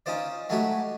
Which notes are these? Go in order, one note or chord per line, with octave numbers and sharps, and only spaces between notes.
C#4 D#4 F4 C5 D5
F#3 G#3 A3 D#4 F#4 G4